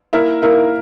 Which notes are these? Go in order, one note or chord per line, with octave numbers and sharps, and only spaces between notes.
A#3 E4 A#4 E5
A#3 E4 A#4 E5